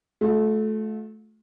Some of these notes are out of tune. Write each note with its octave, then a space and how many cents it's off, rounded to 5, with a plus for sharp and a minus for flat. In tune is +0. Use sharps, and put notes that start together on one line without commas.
A3 -25 F4 +40